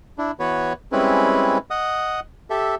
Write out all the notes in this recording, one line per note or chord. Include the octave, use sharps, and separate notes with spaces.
D4 E4
E3 B3 F#4 B4 C#5
G3 G#3 C4 C#4 E4 B4
D#5 F#5 D#6
G4 A4 E5